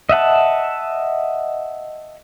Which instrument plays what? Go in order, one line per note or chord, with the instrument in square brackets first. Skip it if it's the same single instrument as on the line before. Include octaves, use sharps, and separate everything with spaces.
[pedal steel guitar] D#5 E5 F#5 A5